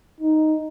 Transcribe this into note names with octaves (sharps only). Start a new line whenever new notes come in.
D#4